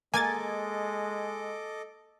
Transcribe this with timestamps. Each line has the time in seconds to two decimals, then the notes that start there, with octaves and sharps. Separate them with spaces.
0.14 G#3 A#3 A4 D#5 G#5 D6 G#6 A6